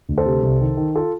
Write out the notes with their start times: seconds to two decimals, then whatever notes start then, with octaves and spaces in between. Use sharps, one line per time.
0.09 D2
0.18 A4 C5
0.26 C3
0.43 C2
0.61 D#3
0.77 D#3
0.95 F4 A4